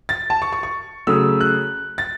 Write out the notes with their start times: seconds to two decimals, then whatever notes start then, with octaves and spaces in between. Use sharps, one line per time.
0.09 A6
0.30 A5
0.42 C#6
0.53 C#6
0.63 C#6
1.07 C#3 F#3 A3 E6
1.40 F#6
1.98 A6